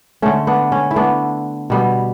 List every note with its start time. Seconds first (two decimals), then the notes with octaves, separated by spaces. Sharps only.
0.22 D3 A3 C#4
0.47 B3 D4
0.72 C#4
0.91 E4
0.96 D3 A3 B3 D4
1.70 B2 G3 B3